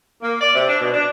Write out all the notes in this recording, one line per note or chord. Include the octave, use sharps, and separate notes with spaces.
A#3
D5
C3
D4
B2
D4